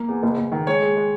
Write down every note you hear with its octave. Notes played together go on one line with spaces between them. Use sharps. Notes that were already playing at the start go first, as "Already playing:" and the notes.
Already playing: A#3
E2
F#1
F#1
D#3
G#3 C#5
G#3
G#3